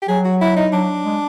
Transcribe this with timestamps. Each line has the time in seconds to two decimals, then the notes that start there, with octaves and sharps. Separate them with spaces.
0.02 G4
0.09 F#3 G#4
0.25 F#4
0.41 E4
0.56 D#4
0.72 F#3 D4
1.05 G#3